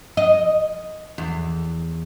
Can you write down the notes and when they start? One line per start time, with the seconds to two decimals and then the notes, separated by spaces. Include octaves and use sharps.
0.17 D#5
1.18 E2